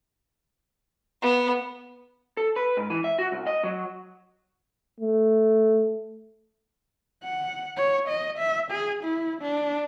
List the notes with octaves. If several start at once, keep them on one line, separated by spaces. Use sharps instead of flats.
B3
A4
B4
G#2
E3
E5
F#4
C2
D#5
F#3
A3
F#5
C#5
D#5
E5
G#4
E4
D4